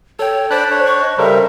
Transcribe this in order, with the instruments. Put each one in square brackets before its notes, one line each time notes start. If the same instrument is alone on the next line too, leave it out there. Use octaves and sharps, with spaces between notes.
[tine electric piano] A4 G5 [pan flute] C#5
[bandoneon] D4 D5 B5 [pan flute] C5 [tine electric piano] F#6
[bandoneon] D4 C#5
[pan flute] C#6
D#5
[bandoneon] C#3 G3 [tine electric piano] A4 A#4 C5 [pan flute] E5